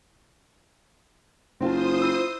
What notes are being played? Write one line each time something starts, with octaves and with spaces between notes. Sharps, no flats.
F#1 C4 F4 C5 A5 D#6
E4 E6